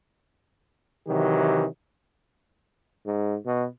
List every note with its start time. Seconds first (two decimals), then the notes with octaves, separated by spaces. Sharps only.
1.08 C3 D#3 E3 F#3 G4
3.06 G#2
3.46 B2